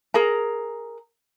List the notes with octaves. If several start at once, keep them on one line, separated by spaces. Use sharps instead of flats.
G#4 A#4 A#5